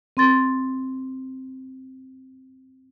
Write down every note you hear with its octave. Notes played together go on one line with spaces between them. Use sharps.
C4 C6 A6